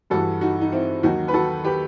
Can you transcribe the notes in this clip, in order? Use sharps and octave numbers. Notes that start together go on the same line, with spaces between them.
G2 E3 G3 F#4 A4
D#4 F#4
D#4
C4 E4
D#2 D#3 F#3 D#4 F#4
B4
F#4 A4
G4 B4